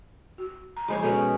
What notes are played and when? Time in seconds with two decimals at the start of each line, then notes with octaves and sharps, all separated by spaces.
0.38 F#4
0.77 A#5
0.88 F3 G#3 C5 C#5 D#5 B5
1.02 B2 C#4 A4 D#5